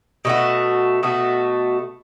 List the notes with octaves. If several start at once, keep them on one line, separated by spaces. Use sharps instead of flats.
B2 A3 F#4
B2 A3 F#4